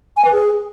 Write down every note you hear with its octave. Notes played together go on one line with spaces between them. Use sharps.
G#5
B4
G#4